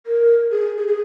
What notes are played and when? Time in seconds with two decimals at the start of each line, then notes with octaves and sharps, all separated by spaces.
0.06 A#4
0.51 G#4
0.78 G#4
0.88 G#4